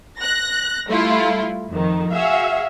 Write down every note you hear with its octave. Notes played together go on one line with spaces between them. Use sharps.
F#6 A#6
G3 A3 E4 F4
F2 D#3
F#4 G#4 E5 F5